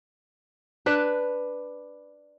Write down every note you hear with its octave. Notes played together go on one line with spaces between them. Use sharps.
D4 B4